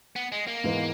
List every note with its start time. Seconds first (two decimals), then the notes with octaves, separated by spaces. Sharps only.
0.16 B3
0.32 G#3
0.48 A#3
0.64 G#2 E3 G#3 B3